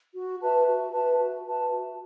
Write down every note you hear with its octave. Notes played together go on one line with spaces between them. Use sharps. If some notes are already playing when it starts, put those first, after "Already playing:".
F#4
B4 E5 A5
F#4
B4 E5 A5
F#4
B4 E5 A5
F#4